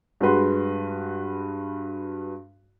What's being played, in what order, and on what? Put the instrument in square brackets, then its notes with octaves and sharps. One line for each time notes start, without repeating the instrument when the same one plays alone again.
[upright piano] G2 G#3 F#4 B4 C6